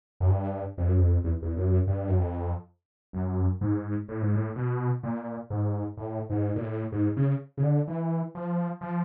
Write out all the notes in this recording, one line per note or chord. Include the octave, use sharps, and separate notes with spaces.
F#2
G2
F2
F#2
F2
E2
E2
F#2
G2
F#2
F2
F#2
G#2
A2
G#2
A2
B2
A#2
G#2
A2
G#2
A#2
A2
G#2
C#3
C#3
D3
E3
F3
F3